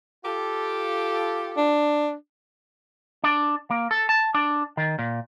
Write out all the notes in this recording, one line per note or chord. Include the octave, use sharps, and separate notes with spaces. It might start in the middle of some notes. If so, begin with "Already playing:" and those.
F4 G4 A4
D4
D4
A#3
A4
A5
D4
D#3
A#2